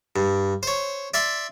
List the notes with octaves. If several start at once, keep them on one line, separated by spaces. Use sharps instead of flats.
G2
C5 C#5
D5 E5 C6